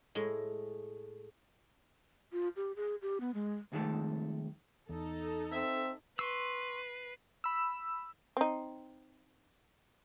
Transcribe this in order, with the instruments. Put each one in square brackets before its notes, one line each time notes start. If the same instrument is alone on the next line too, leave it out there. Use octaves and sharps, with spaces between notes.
[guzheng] A2 G#3
[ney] F4
G4
G#4
G4
B3
G#3
[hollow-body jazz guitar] C2 F2 D#3 G#3 A3 A4
[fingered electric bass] E2 [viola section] D#4 A4
[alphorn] C4 [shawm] E5
[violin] B4 [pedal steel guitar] C6 C#6 E6 [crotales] C7
[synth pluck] B5 E6
[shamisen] C4 D#4